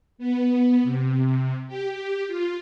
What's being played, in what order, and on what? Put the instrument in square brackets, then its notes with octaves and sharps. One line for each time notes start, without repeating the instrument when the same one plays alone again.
[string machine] B3
C3
G4
F4